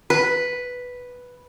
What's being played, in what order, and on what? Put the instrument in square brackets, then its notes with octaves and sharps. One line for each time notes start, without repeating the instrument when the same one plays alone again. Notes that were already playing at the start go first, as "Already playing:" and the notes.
[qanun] B4